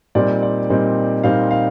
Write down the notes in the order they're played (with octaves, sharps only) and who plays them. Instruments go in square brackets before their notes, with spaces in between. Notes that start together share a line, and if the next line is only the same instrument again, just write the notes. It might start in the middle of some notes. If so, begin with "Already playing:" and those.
[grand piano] A#2 G3 C4 D#4 D5
D5
A#2 G3 C4 D#4
A#2 G3 C4 D#4 F5
F5